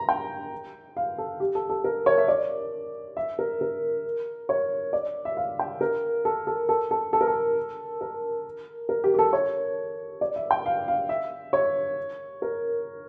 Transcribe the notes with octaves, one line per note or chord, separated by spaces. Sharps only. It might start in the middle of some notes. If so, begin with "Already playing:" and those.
Already playing: A#5
G5
F5
A4
G4
A4
A4
A#4
C#5
E5
D5
E5
A#4
A#4
C#5
D5
E5
F5
G5
A#4
A4
A4
A4
A4
A4
A#4
A4
A#4
A#4
G4
G4
A4
C#5
D5
E5
G5
F5
F5
E5
C#5
A#4